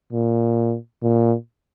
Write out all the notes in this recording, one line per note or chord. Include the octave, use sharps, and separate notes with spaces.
A#2
A#2